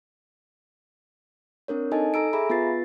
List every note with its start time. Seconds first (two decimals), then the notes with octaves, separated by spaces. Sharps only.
1.68 C4 D4 A#4 C#5
1.91 D#4 A4 D#5 G#5 A5
2.14 A4 A#5 E6 D7
2.33 G#4 E5 G#5 A#5 B5
2.50 B3 F4 B4 A6 C7